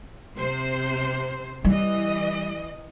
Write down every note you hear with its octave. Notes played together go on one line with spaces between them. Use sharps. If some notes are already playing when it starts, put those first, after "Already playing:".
C3 C5
E3 G3 D#5